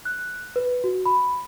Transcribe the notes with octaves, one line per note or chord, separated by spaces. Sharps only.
F#6
B4
F#4
B5